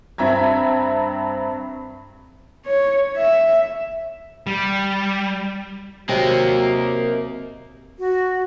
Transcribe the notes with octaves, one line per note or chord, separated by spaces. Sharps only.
G2 C4 E5 A#5 G#6
C#5
E5
G3
C3 F#3 A#3 D#5
F#4